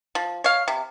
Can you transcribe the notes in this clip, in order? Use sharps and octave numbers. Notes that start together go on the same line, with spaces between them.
F3
C#5 F5
C3